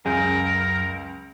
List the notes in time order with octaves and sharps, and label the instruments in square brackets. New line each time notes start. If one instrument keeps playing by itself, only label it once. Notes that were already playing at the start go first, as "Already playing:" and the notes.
[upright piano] C#2 C#3 G6 [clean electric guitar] F#2 [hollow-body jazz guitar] G#4 [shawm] A#4